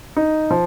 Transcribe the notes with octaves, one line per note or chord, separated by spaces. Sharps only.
D#4
F3